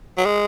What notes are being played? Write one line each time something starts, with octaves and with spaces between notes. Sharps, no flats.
F#3
G#3